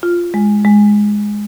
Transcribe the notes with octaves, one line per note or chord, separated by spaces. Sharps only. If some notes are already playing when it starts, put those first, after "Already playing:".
F4
G#3
G#3